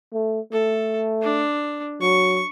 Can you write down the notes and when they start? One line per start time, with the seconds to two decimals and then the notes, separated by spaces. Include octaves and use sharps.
0.13 A3
0.52 A3 A4
1.22 D4
2.01 F#3 C#6